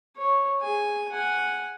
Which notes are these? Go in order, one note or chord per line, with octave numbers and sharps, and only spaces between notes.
C#5
G#4 G#5
F#5 G#5